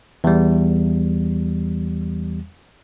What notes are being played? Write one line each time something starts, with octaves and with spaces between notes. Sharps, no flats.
E2 G3